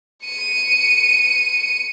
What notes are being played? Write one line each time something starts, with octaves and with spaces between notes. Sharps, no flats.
C#7 D#7